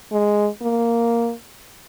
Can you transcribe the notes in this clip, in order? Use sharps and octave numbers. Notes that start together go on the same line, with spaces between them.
G#3
A#3